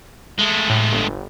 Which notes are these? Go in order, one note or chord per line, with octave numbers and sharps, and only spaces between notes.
G#3 A3
A2
G1